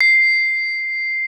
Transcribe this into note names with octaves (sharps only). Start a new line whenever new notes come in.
C7